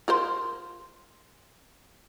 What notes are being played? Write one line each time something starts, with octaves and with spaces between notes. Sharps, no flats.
F4 A#4 C5